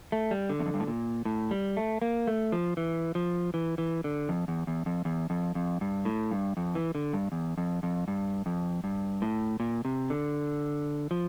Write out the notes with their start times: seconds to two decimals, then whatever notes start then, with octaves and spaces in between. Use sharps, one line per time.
0.12 A3
0.31 G3
0.50 D3
0.60 E2
0.66 F2
0.74 G2
0.80 A2
0.87 A#2
1.25 A2
1.51 G3
1.77 A3
2.02 A#3
2.27 A3
2.52 F3
2.77 E3
3.15 F3
3.54 E3
3.78 E3
4.04 D3
4.29 F2
4.48 E2
4.67 E2
4.86 F2
5.05 E2
5.30 F2
5.55 F2
5.81 G2
6.05 A2
6.31 G2
6.57 F2
6.75 E3
6.95 D3
7.13 G2
7.32 E2
7.58 F2
7.83 F2
8.08 G2
8.46 F2
8.84 G2
9.22 A2
9.60 A#2
9.85 C3
10.10 D3
11.11 F3